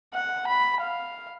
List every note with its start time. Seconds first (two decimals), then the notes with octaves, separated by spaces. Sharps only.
0.14 F#5
0.47 B5
0.81 F5